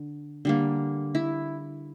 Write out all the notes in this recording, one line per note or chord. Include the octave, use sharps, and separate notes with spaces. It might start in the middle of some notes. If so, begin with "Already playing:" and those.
Already playing: D3
D3 G3 A#3
E4